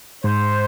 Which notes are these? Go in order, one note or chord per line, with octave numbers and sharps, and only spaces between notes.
G#2 C5